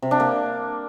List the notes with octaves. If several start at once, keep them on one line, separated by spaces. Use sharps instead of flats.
C3
D4
A#3